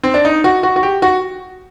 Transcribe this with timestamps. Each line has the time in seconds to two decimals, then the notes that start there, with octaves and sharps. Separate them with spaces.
0.03 C4
0.14 D4
0.25 D#4
0.44 F#4
0.63 F#4
0.76 F#4
0.83 G4
1.02 F#4